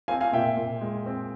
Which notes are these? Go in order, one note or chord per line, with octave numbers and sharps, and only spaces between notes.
C4 F5 G#5
F5 G#5
A#2 E5 G5
A#2
G#3
C4